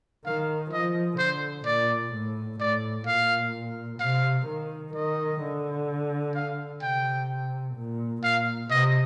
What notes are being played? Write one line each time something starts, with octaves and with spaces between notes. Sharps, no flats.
D#3 F5
F3 D#5
D3 C5
A#2 D5
A2
A2 D5
A#2 F5
C3 F5
D#3
D#3 D#5
D3
F5
C3 G5
A#2
A#2 F5
C3 D#5